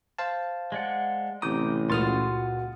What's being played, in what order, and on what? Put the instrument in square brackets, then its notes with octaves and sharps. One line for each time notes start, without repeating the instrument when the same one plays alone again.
[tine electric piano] C5 F5 A5
[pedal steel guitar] G#3 D5 F#5
[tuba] A1 [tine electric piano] C3 D#6 [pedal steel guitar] A#5 D6 G6
[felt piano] C#2 A#2 [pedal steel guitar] F4 F#4 C6 [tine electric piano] D#6 F6 A6